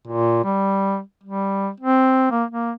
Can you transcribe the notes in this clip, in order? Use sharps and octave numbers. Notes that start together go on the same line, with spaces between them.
A#2
G3
G3
C4
A#3
A#3